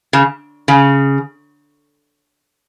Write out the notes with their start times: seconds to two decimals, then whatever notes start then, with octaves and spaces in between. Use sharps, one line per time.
0.13 C#3
0.68 C#3